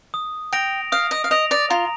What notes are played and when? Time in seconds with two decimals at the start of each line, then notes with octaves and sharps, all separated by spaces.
0.14 D#6
0.53 G5 A#6 D7 F7
0.92 F5 D#6
1.11 D#5
1.24 F5
1.31 D#5 A#6 D7 F7
1.51 D5
1.70 F4 A#5